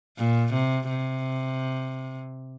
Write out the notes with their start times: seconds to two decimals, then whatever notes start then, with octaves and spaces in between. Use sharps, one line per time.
0.18 A#2
0.53 C3
0.89 C3